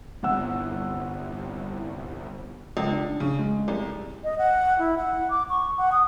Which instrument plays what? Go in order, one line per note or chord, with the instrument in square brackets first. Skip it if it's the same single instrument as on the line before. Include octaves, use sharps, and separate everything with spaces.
[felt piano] G1 F#5 E6 [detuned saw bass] C2
[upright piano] C#2
D4
C#3
G#3
C2
[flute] D#5
F#5
E4
F#5
D6
C#6
F#5
D#6